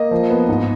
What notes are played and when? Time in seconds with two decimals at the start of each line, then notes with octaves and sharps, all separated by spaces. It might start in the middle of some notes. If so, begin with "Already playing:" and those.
Already playing: A#3 D#5
0.11 F3
0.30 B3
0.49 G#2